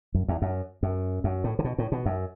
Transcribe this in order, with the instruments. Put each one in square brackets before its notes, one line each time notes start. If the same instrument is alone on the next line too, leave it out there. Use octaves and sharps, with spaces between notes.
[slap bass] F#2
E2
F#2
F#2
F#2
A2
D3
B2
A2
B2
F#2